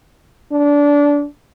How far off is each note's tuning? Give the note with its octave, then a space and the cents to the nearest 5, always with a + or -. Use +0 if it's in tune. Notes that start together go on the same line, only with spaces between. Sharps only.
D4 -20